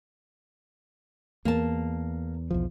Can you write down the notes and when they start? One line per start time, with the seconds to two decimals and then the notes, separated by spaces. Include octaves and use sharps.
1.45 E2 A#3 A5
2.51 B1 E2 F3